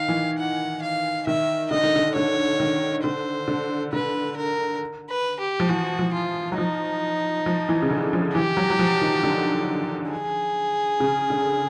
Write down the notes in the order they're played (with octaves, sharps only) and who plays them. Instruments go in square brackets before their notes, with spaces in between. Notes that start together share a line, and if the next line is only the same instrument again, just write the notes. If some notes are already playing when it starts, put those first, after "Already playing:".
Already playing: [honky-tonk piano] D#3 [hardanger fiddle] F5
[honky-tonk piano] E3
[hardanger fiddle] F#5
F5
[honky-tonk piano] D#3 [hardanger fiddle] E5
[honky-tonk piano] D3 [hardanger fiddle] D#5
[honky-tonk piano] D#3
D3
[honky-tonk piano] D3 [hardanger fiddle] C#5
[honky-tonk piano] D#3
[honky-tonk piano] D3 [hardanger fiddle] C5
[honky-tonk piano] D3
[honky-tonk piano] D3 [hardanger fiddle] B4
[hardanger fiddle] A#4
B4
G4
[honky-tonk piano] F3
[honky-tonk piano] E3 [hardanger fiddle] F#4
[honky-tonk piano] F3
[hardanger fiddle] F4
[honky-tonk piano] F#3
[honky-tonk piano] F3 [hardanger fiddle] D#4
[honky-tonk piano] F3
E3
C#3
D3
F3
[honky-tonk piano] E3 [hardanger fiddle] G4
[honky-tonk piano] F#3
F#3
F3
D#3
D3
[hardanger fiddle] G#4
[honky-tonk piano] C#3
D3